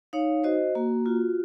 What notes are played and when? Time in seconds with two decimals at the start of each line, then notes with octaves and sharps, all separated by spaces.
0.13 D#4 C#5 F5
0.44 F#4 C5 D#5
0.75 A#3 F#4
1.06 F4 F#4